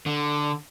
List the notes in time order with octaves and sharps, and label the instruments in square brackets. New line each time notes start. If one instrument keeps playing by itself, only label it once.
[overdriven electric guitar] D3